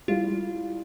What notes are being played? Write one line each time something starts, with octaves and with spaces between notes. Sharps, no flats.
G3 E4 F4